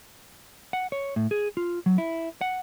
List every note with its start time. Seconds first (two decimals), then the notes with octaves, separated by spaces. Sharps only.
0.73 F#5
0.92 C#5
1.16 A2
1.31 G#4
1.57 F4
1.86 F#3
1.98 E4
2.41 F#5